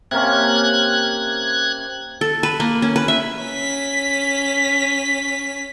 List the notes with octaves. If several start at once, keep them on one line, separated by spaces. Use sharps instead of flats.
C3 A#3 C#4 F#6 G#6
A4
B4
A#3
C#4
B4
E5
C#4 B6